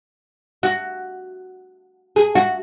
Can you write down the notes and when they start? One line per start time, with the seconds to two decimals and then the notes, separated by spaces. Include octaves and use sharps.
0.63 F#4
2.16 G#4
2.35 F#4